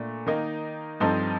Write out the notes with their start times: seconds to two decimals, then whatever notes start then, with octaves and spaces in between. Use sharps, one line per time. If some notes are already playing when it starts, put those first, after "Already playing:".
Already playing: A#2 A3 D4
0.26 D#3 A#3 D#4
1.00 G2 F3 C4 D#4 A4